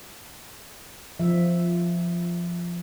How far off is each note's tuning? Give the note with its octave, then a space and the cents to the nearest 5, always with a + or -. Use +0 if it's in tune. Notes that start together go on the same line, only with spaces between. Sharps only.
F3 -5 E5 +0